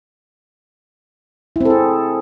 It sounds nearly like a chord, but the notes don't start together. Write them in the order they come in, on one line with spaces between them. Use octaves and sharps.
E4 C4 A4 G#4